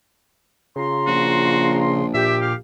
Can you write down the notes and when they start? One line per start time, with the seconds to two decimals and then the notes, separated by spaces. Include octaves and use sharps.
0.76 C#3 F4 A#5 C6
1.07 A#1 F#4
2.14 A#2 G4 E5
2.41 F5